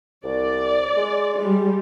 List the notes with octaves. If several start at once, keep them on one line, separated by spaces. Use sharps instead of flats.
C2 D5
G#3
G3 G#3